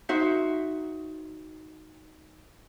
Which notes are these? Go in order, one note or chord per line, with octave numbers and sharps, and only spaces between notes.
D#4 F#4 C5 E5